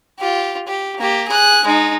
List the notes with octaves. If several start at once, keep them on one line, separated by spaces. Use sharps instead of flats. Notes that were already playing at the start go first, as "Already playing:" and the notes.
F4 G4
G4
A#3 G4
G#4 F#6
G#3 D#4